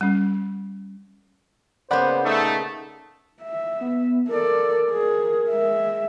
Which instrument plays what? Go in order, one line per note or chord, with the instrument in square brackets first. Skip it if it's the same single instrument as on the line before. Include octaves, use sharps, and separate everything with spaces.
[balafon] G3 C#4
[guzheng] C#3 A#3 B3 [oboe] C5 [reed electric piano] D5 F#5 B5
[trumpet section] A3 [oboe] D#4
[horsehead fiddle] E5
[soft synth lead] B3
[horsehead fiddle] A4 D5 [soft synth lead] A#4
[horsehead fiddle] G#4
G#3 E5